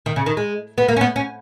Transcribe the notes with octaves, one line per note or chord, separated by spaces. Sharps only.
D#3
C#3
D#3
G#3
B3
A#3
C#4
B3
C#4